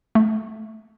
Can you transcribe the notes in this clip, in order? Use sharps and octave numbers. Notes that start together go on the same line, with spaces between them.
A3